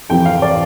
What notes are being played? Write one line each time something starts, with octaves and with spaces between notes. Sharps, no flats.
F2 C3 E3 G5
F5
D5